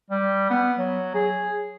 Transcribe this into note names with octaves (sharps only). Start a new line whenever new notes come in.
G3
B3
F#3
G#4